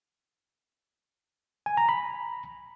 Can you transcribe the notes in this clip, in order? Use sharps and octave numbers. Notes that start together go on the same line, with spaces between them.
G#5
A#5
B5